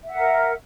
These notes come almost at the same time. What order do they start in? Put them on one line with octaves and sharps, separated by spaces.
E5 F#5 A#4